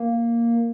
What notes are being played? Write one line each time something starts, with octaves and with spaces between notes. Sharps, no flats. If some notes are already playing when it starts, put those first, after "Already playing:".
Already playing: A#3